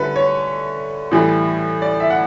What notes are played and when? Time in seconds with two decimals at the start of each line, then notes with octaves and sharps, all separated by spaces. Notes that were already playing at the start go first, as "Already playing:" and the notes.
Already playing: D3 G3 C#4 E4 A4 B4
0.16 C#5
1.11 A2 E3 G3
1.82 D5
2.00 E5
2.10 F#5